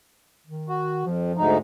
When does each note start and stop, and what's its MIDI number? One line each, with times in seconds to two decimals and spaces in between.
0.47 1.01 51
0.69 1.05 66
1.05 1.32 41
1.05 1.42 53
1.37 1.58 38
1.37 1.58 44
1.37 1.58 63